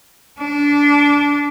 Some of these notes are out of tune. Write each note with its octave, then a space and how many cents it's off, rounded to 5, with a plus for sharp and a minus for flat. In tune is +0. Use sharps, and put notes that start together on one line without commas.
D4 -20